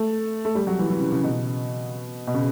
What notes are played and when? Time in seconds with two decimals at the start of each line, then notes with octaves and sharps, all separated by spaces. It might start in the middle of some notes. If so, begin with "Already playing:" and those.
Already playing: A3
0.45 A3
0.55 G3
0.67 F#3
0.79 E3
0.90 E3
1.01 C#3
1.12 C#3
1.24 B2
2.27 B2
2.34 C#3